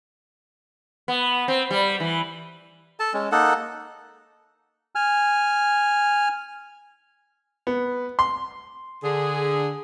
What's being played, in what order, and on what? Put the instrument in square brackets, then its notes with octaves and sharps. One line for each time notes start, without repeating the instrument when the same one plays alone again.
[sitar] B3
C4
G3
E3
[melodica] A4 A5
G#3 C#4
A#3 D#4 A4 F#5
[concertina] G#5 F6
[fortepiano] B3
C6
[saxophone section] D3 G#4